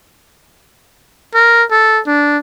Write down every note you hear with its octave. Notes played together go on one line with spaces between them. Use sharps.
A#4
A4
D4